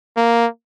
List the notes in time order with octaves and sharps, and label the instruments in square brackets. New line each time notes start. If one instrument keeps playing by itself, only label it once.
[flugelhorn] A#3